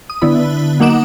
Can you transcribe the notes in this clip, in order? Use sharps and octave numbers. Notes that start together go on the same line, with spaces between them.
D#6
D3 B3 E4 B5
F#3 A#3 D#4 F#5 D6 E7